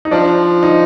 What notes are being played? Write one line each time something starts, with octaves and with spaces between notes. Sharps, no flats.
D#4
F3 D4
D#4